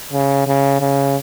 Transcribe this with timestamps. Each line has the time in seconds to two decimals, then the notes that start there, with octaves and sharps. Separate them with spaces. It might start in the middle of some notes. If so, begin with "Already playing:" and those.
0.13 C#3
0.47 C#3
0.80 C#3